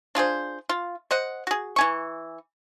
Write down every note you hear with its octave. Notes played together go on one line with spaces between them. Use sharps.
D4 F4 G#4 C5
F4
C5 D#5 F#5
F#4 G#4
E3 G#5 C#6